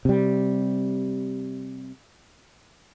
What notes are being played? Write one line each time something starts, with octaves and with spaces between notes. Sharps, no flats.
C3 G3